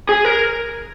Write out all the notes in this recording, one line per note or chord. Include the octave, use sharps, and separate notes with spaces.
G#4
A#4